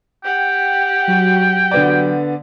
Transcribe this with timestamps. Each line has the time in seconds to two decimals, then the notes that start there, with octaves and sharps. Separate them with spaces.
0.24 G4 F#5 G5
1.08 F#3 F#4
1.71 D3 B3 D5